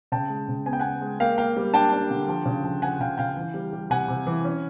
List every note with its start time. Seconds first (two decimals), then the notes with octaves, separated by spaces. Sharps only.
0.12 C#3 G5 A5
0.30 G#3
0.48 C#3
0.66 B3 G#5
0.73 G5
0.80 B3 F#5 G#5
1.01 G#3
1.20 A#3 F5 G5
1.38 A#3 F5 G5
1.57 G3
1.73 D4 G5 A5
1.92 D4
2.11 D3
2.28 F3
2.46 C#3
2.64 F3
2.82 F3 F#5 G#5
3.00 C#3 F5 G5
3.18 C#3 F5 G5
3.37 E3
3.54 G3
3.73 G3
3.90 C3 F#5 G#5
4.08 C3
4.27 E3
4.44 C#4